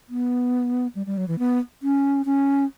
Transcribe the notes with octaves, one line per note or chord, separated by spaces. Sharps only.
B3
G3
G3
F#3
E3
B3
C#4
C#4